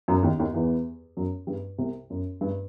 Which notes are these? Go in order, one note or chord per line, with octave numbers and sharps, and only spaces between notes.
F#2 F#3
D#2 D#3
D#2 D#3
E2 E3
F#2 F#3
G2 G3
C2 C3
F#2
G2